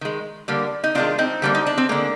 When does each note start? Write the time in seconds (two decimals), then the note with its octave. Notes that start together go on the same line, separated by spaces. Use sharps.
0.01 D#3 G#3
0.48 D3 G3 A#3
0.84 D#4
0.95 C3 D#3 G#3 D4 F4
1.18 C4 D#4
1.42 D3 G3 A#3
1.55 D#4
1.67 D4
1.78 C4
1.89 D3 G#3 A#3